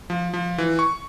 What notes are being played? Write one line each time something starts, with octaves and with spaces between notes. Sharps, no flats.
F3
F3
E3
C#6